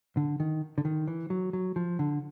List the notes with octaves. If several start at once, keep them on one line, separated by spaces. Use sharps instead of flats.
D3
D#3
D3
D#3
E3
F#3
F#3
F3
D3